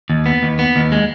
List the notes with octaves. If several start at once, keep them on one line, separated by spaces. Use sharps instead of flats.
D#2
B3
D#2
B3
D#2
G#3